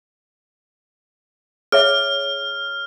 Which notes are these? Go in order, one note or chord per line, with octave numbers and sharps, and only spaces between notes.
G#4 C#5 E5 F6